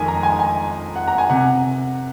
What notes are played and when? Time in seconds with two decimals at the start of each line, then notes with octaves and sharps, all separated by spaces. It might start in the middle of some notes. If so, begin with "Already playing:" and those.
Already playing: F2 D#3 G#3 A#4 G#5
0.08 A#5
0.23 G#5
0.39 G#5
0.96 F#5
1.08 A#5
1.18 G#5
1.30 C3 F#5